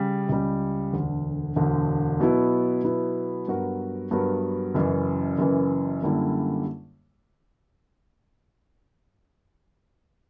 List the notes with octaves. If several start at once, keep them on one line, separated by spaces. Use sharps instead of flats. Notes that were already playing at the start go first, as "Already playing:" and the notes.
Already playing: C#3 G3
C#2 C#3 G3
E1 D2 D3
E1 D2 D3
B2 F#3 B3 E4
B2 F#3 B3 E4
G2 F#3 B3 F#4 A#4
G2 F#3 B3 F#4 A#4
F#1 F#2 E3
F#1 F#2 E3
F#2 D3 G3 A#3 E4